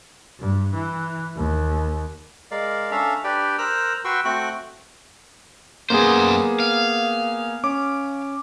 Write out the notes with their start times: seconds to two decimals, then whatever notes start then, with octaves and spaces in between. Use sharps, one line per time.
0.40 G2
0.74 E3
1.36 D#2
2.51 G#3 A#4 D5 F5
2.91 C#4 D4 A4 E5 F5 A#5
3.24 D4 G4 B4 D5 G5
3.58 A#4 C5 A#5 E6 F#6
4.05 F#4 B4 G5 C6 C#6 E6
4.25 A3 C4 F#4 G5 C#6 F#6
5.90 F#2 A#3 B3 G#4 C5
6.60 F5
7.64 C#4 D6